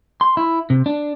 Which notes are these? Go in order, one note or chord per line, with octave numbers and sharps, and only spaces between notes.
C6
E4
C3
D4